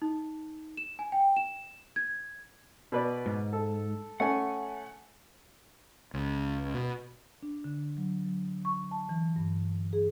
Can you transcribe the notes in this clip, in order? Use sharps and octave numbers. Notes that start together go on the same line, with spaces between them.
D#4
E7
G#5
G5
E7
G#6
B2 B4 D5
G#2
A4
A3 C#4 F#5 G#5
C#2
B2
D4
D3
F#3
F#3
C#6
A5
E3
G2
G#4